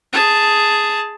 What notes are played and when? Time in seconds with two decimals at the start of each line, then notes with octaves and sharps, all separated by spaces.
0.13 G#4 A5